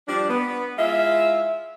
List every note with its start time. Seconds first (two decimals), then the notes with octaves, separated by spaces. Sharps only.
0.08 F3 G3 D4
0.29 B3
0.78 G#3 E4 F4 E5